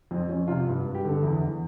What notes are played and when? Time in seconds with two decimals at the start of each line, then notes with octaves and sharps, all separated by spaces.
0.11 F2 C4
0.29 F2 C#4
0.48 C3 F4
0.67 G2 F4
0.86 G2
0.95 G4
1.04 D3 A4
1.23 E2 E4
1.42 E2